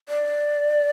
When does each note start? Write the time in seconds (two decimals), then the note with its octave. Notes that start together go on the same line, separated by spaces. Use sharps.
0.09 D5